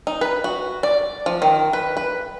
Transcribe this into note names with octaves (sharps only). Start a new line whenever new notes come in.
D#4
B4
F#4
D5
F3
D#3
B4
B4